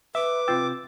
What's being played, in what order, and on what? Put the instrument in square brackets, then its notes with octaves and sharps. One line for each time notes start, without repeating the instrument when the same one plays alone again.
[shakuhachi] B4 [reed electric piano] E5 [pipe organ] D6
[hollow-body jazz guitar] C3 F4 G5 [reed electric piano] E6 A6